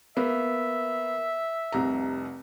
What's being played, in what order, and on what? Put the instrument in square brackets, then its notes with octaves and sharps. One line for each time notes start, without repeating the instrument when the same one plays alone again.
[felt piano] A#3 B3 [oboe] E5
[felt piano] F1 C2 A#5